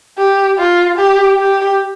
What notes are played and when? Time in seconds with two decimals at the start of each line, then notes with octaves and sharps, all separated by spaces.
0.18 G4
0.58 F4
0.98 G4
1.38 G4